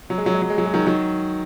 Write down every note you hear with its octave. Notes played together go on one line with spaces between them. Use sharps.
F#3
G#3
F#3
G#3
F#3
G#3
F#3
G#3
D#3 F#3
D#3 F#3